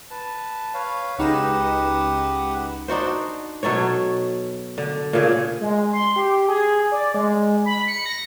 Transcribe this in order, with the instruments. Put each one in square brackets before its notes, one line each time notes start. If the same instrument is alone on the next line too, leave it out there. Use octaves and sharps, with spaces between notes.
[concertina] B4 A5
B4 C#5 F5
[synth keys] C#2 D#4 E7 [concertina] G4 B4 F#5
[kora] D4 D#4 F#4 C5
B2 F#3 A4 C#5
D3
A#2 C#3 G#4
[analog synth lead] G#3
C6
G4
G#4
D5
G#3
B5
C#7
A#6